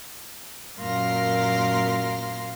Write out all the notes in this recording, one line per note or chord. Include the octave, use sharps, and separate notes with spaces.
F#2 A#2 A#4 F5 C6 A#6